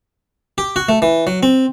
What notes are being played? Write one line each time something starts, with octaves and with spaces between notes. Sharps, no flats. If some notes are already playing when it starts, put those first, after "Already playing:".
G4
F#4
A3
E3
F#3
C4